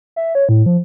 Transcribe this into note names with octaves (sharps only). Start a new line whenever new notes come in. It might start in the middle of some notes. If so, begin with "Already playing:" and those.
E5
C#5
A2
F3